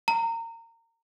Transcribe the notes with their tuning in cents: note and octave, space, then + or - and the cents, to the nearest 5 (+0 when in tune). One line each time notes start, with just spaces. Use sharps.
A#5 -25